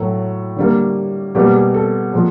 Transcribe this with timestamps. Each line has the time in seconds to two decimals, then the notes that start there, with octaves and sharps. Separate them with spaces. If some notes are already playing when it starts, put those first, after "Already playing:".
Already playing: A2 F#3 A3
0.56 D3 G3 A#3
1.35 B2 G3 A#3 G4
1.55 G#4
1.74 A4
2.13 A#2 F3 G#3